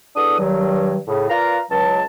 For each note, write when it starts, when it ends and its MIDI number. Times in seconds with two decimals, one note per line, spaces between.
0.16 0.38 40
0.16 0.38 62
0.16 0.38 69
0.16 0.38 78
0.16 0.38 87
0.39 0.96 43
0.39 0.96 51
0.39 0.96 54
0.39 0.96 55
1.07 1.29 45
1.07 1.29 49
1.29 1.59 65
1.29 1.59 70
1.29 1.59 71
1.29 1.59 74
1.29 1.59 77
1.29 1.59 82
1.71 2.02 37
1.71 2.02 54
1.71 2.02 81